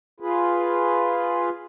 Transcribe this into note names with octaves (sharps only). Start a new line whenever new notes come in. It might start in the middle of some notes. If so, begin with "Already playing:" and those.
F4 G#4 B4